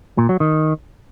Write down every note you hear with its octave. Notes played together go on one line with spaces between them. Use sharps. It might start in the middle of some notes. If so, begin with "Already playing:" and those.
A#2
F#3
D#3